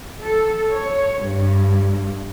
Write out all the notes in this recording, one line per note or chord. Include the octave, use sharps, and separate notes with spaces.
A4
C#5
G2